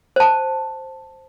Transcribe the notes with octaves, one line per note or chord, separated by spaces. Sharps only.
C5 A5